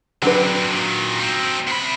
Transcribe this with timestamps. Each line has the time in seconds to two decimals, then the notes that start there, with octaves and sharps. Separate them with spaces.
0.22 D3 F#3 C4 D4 B4
0.72 A#2 D#3
1.19 C4 D#4
1.68 C3 B5